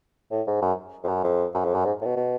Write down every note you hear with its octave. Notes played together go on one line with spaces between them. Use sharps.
A2
G#2
F#2
F2
F#2
F2
F#2
F2
F#2
G#2
A2
B2
B2